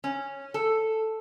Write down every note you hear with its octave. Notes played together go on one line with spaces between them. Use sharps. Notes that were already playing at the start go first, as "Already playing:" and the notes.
C#4
A4